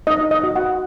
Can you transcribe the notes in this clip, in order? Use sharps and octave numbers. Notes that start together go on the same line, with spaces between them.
D#4 D#5
D#5
F#4
F#5